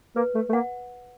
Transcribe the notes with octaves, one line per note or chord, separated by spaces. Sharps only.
A#3 B4
A3
A3
A#3 F#5